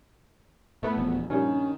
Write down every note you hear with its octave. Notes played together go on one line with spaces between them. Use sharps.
A2 A3 B3
D#1 E2 F3
A#1 G2 D#3 C#4